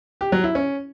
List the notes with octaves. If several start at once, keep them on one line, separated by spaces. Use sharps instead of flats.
G4
F#3
E4
C#4